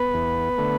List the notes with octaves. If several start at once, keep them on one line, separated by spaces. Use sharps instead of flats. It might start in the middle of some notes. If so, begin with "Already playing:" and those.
Already playing: B3 B4
E2
D3 A3